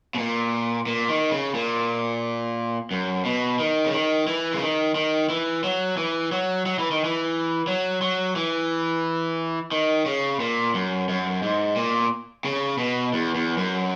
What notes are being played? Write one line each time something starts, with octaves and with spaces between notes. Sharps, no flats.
B2
A#2
A#2
D#3
C#3
A#2
F#2
B2
D#3
C#3
D#3
E3
C#3
D#3
D#3
E3
F#3
E3
F#3
F#3
E3
D#3
E3
F#3
F#3
E3
D#3
C#3
A#2
F#2
F#2
G#2
A#2
C#3
B2
E2
E2
F#2